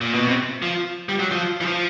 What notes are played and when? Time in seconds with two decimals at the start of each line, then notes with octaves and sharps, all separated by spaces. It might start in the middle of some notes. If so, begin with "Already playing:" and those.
0.01 A#2
0.14 B2
0.28 C3
0.62 F3
1.09 G3
1.20 F#3
1.31 F3
1.61 E3
1.65 F3